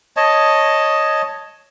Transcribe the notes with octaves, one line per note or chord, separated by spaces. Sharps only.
C#5 D#5 A5